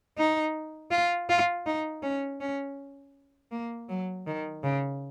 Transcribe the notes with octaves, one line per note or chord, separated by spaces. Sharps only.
D#4
F4
F4
D#4
C#4
C#4
A#3
F#3
D#3
C#3